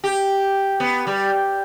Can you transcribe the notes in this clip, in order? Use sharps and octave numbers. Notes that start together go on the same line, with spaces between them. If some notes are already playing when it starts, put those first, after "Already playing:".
G4
B3
G3